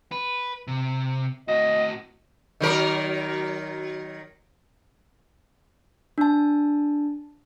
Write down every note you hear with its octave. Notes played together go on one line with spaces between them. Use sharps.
B4
C3
A2 F#4 D#5
D#3 F#3 A#4
D4 A5